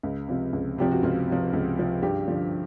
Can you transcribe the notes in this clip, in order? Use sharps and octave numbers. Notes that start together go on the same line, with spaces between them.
C#2
C3 F3
C#2
C3 F3 G4
F#4
C#2 F4
C3
F3
C#2
C3 F3
G2 G4
D3 F3